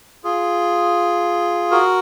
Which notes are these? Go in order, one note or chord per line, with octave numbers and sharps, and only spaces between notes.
F4 G#4
F#4 A#4